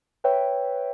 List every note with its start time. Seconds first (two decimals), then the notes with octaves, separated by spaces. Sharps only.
0.24 B4 C#5 E5 G5